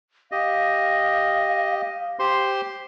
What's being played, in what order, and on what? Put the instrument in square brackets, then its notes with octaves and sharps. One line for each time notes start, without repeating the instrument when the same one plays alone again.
[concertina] G4 D#5 [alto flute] F5
[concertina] G4 C5 C6